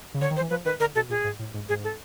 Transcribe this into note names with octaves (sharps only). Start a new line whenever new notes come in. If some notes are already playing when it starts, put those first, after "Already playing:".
C#3
D3 C#5
D#3
C5
E3
F3 B4
D#3 B4
D3 A#4
B2 A4
A#2 G#4
G#2
A2
G#2
G#2 G#4
A4